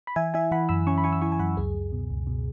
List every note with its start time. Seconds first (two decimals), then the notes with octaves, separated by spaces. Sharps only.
0.07 B5
0.16 E3 E5 G#5
0.34 E4 E5 G#5
0.51 E3 F#5 B5
0.69 F#2 B5 E6
0.87 C#4 G#5 C#6
0.98 B5
1.04 C#4 G#5 C#6
1.13 E6
1.22 E4 G#5 C#6
1.32 G#5
1.39 F#2 F#5 B5
1.57 C#2 G#4
1.75 C#2
1.92 B2
2.10 C#2
2.27 B2